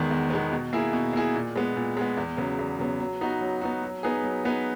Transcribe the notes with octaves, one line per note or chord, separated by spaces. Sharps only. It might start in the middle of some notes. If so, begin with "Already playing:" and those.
Already playing: E2 D#3 G#3 B3
E2
D#3 G#3 B3
B2
A#3 E4 G#4
B2
A#3 E4 G#4
A#2
G#3 B3
A#2
G#3 B3
E2
C#3 F#3 B3
E2
C#3 F#3 B3
F#3
B3 D#4 F#4
F#3
B3 D#4 F#4
F#3
B3 D#4 G#4 B4
F#3
B3 D#4 G#4 B4